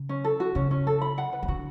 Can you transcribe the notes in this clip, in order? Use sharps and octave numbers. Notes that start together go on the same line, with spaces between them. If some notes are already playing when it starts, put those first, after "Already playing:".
Already playing: C#3
C#4
A4
F#4
C#3 C#4
C#4
A4
B5
F#5
B4
E3
D3 F#4